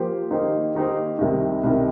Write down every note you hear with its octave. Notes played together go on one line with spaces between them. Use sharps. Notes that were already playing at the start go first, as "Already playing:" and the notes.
Already playing: F3 A#3 G4 C5
D#3 A#3 D#4 G4 C5
D#3 A#3 D#4 G4 C5
C2 C3 D#3
C2 C3 D#3